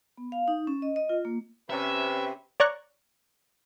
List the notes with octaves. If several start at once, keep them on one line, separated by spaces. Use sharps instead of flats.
B3
F5
D#4
C#4
D#5
D#5
F4
A#3
C3 C#4 B4 E5
C#5 D5 A#5 C#6 F#6